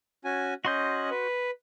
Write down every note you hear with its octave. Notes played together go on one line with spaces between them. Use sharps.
C#4 F#4 G#5
C#4 F#4 D#5 C6 G6
B4